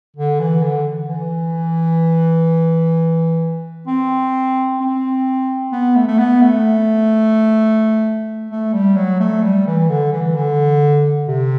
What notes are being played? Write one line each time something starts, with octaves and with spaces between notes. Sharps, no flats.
D3
E3
D3
E3
C4
C4
B3
A3
A3
B3
A3
A3
G3
F#3
A3
G3
E3
D3
E3
D3
C3